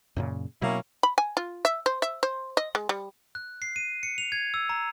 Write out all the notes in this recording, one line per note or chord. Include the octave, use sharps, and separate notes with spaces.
F#2 A#2 C#3
B2 F#3 A#3 C#4 E4
B5
G#5
F4
E5
C5
E5
C5
D#5
G#3
G3
F#6
C7
D#7
C#7
F7
G#6
E6
A#5